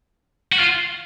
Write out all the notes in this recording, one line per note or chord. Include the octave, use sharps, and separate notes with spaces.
F#4
F4